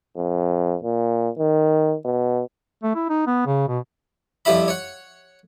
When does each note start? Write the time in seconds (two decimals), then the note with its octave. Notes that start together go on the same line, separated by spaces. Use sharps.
0.16 F2
0.83 A#2
1.38 D#3
2.05 B2
2.83 A3
2.95 E4
3.09 D#4
3.27 B3
3.46 C#3
3.68 B2
4.45 F2 F3 G3 E4 E5 B5
4.68 C#5 F#5